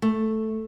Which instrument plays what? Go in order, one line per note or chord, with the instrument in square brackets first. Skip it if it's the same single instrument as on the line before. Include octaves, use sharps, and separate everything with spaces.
[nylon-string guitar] A3